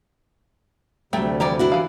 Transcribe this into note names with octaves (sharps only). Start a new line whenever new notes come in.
D2 C3 F#3 G3 A3 G5
E3 F3 D5 G5 A#5
D4 E4 F#4
E3 F5